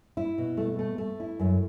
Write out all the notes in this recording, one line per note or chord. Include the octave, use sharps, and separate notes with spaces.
E4
B2
A3
A3
A3
E4
F#2